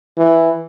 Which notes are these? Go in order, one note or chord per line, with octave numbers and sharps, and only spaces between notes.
E3